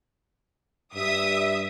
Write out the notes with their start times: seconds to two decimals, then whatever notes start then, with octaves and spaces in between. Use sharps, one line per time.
0.95 G2 E5 D#6